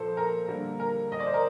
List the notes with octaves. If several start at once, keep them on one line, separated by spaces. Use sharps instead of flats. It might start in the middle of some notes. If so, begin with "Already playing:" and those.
Already playing: A#2 F3 A4 C5
A#4
D3 G3 A#3
A#4
D#5
D5
C5
A#4